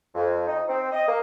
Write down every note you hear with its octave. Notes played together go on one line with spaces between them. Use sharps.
F2
D#4
C4
D#5
A#3